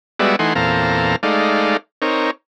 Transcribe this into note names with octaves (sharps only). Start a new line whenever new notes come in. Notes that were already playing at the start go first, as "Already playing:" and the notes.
G3 G#3 B3 F#4 D5 E5
E3 A3 D#4 F#5 G#5 C6
E2 A#2 C4 A4 F5 A#5
G#3 A3 D#4 D5 F5
C4 D#4 A#4 C#5